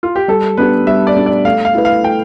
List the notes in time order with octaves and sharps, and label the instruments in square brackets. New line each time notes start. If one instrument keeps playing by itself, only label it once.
[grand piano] F4
G4
[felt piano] G3 [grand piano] A4
[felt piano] B3 D4 G4 [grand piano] B4
[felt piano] G3 [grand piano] E5
[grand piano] D5
[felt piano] B3 D4 G4
[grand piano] D5
[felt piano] A3 [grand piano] F5
[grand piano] F5
[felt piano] E4 B4
[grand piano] F5
[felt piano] A3 [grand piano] G5